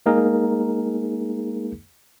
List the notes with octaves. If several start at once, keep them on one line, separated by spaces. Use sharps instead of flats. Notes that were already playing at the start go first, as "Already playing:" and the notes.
G#3 A#3 D#4 G#4 A#4